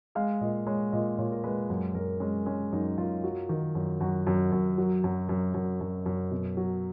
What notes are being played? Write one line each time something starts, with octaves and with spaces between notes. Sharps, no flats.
G#3 F5
A#2 D#5
G#3 C#5
A#2 D#5
A#2 C#5
A#4
G#3 B4
F#2
F#2 A#4
G#3 C#4
G#3 C#4
F#2 D#4
F#2 F4
F#3
D#3
F#2
F#2 F#4
F#2
F#2
F#3
F#2
F#2
F#2
F#2
F#2
B2
F#3